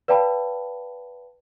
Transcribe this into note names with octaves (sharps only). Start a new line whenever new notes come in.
B4 D5 F5 G5 A5 B5